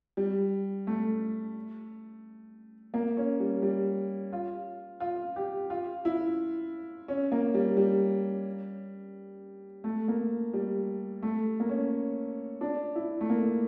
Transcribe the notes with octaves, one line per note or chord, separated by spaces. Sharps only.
G3
A3
A#3
C#4
G3
G3
F4
F4
G4
F4
E4
C#4
A#3
G3
G3
A3
A#3
G3
A3
A#3
C#4
D4
E4
A3
A#3